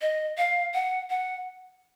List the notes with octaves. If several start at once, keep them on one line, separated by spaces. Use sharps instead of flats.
D#5
F5
F#5
F#5